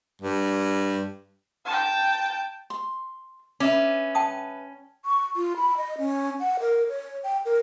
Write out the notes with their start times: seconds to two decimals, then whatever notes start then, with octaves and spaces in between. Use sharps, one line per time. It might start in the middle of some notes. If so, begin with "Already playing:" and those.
0.22 G2
1.65 G5 A5
2.70 C6
3.60 C#4 B4 E5 D6
4.15 G5 A5 D#6
5.05 C#6
5.36 F4
5.57 B5
5.77 D#5
5.98 C#4
6.40 F#5
6.60 A#4
6.89 C#5
7.24 G5
7.45 A#4